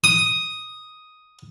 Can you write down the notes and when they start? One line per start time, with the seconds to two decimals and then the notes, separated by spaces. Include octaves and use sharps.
0.04 D#6